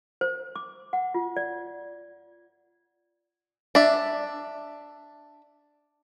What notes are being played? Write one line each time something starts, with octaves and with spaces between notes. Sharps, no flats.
C5
D6
F#5
F4
D5
D4 E5